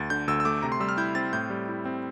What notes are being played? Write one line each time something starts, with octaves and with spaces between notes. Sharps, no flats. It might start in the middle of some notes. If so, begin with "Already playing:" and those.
Already playing: D2 A6
D3 G6
D2 E6
E6
A3 D6
C3 A#5
C6
G3 E6
F6
E4 G6
C4 A6
A2 G6
G3
E4
C4